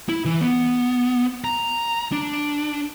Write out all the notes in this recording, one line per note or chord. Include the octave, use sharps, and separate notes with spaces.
E4
E3
B3
A#5
D4